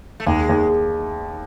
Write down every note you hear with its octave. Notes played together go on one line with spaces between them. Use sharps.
A3
D#2 G#3
D#2